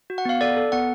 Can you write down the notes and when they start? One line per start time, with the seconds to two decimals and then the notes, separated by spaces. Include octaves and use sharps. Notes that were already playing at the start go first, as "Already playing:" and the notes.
0.10 F#4
0.18 F#5
0.25 B3 F5
0.41 A4 D5
0.57 A4
0.72 B3 F#5